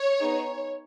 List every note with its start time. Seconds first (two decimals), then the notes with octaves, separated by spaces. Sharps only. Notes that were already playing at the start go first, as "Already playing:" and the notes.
Already playing: C#5
0.20 B3 D#4 G#4